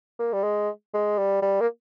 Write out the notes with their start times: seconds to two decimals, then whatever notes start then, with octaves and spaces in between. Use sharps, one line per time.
0.19 A#3
0.33 G3
0.43 G#3
0.93 G#3
1.18 G3
1.42 G3
1.61 A#3